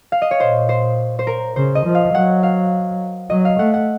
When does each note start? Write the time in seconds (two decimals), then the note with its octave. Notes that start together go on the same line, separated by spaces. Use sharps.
0.12 F5
0.22 D#5
0.31 C#5
0.40 A#2 C5
0.69 C5
1.19 C5
1.27 A#4
1.56 C#3 C5
1.75 D#5
1.86 F3
1.95 F5
2.14 F#3 F#5
2.43 F5
3.30 F#3 D#5
3.45 F5
3.59 A3 F#5
3.74 F#5